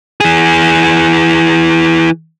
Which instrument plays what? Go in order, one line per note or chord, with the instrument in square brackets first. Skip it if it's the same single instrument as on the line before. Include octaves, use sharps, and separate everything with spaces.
[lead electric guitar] E3 G#4